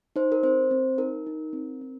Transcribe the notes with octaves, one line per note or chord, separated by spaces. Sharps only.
D#4 C5
A#4
C4 C5
C4
D#4 A#4
D#4
C4
C4